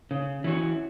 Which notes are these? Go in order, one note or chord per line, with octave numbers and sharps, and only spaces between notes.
C#3
E3 C#4 F#4